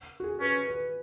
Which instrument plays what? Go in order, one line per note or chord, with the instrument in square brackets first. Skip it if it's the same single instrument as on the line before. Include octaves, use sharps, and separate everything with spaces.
[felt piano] F#4
G#4
[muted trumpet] C#4 [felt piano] B4
[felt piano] B4